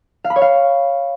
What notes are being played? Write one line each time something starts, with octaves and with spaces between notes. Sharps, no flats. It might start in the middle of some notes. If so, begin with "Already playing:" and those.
F5
B5
C#5
F5